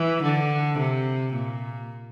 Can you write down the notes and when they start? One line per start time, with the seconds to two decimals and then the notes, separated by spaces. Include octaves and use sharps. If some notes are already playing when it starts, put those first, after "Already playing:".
Already playing: E3
0.23 D3
0.78 C3
1.33 A#2